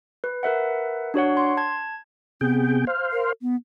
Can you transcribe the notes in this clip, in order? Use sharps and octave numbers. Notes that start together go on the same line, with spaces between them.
B4
A#4 B4 E5 F#5
D4 F#4 C#5 F#5
C6
A5 G#6
C3 B3 G#4 G5
C5 F5
A#4
B3